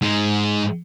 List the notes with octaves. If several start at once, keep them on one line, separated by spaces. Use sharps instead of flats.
G#2 G#3